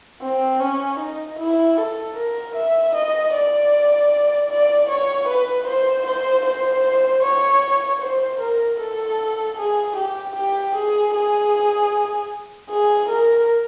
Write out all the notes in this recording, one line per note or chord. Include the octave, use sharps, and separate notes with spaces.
C4
C#4
D#4
E4
A4
A#4
E5
D#5
D5
D5
C#5
B4
C5
C5
C5
C#5
C5
A#4
A4
G#4
G4
G4
G#4
G#4
G#4
A#4